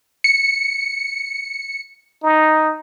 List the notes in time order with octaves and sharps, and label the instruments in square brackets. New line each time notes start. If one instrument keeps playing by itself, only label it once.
[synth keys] C#7
[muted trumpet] D#4